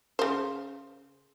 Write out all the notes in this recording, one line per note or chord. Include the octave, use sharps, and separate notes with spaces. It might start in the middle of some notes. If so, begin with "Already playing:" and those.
C#3 C5